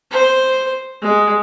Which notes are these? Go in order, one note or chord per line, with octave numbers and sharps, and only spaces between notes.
C5
G#3